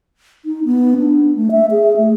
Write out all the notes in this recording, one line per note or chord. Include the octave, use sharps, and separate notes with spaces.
D#4
B3
D4
A3
E5
G#4
A3